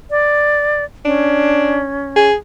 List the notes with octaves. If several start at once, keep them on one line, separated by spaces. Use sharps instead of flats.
D5
C#4 D4
G#4